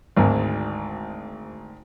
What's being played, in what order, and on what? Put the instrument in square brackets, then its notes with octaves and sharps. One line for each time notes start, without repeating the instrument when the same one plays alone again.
[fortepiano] G#1 D2 G#2